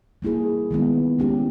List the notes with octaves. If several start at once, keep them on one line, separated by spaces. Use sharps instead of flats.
G3 A#3 E4 G#4
D#3 G#3 B3 E4
G#3 C#4 E4 G4